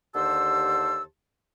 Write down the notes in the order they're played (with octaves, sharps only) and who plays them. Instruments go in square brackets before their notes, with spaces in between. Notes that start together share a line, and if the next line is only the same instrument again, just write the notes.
[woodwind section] D#2 D3 G4 C5 A5 E6